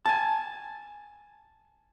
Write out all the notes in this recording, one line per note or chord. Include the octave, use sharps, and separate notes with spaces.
G#5 A5